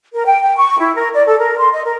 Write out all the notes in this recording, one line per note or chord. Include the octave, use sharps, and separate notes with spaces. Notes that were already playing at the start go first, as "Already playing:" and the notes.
A#4
G5
G5
C#6
E4
A#4
D5
A4
A#4
C6
D#5
A#4